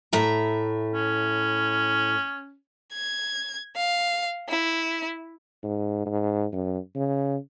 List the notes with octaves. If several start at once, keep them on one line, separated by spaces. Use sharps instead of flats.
A2 E5 A#5
C#4
G#6
F5
E4
G#2
G#2
F#2
C#3